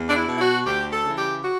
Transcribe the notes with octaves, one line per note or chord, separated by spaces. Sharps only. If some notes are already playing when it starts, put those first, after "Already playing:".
Already playing: E2
D4
E4
B2
E4
F#4
D2 G4
A4
C#3 E3
G4
F#4